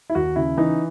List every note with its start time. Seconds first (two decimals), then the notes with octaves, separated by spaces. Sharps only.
0.10 E4
0.15 D#2 F#4
0.36 C#3 E4
0.57 E3 D#4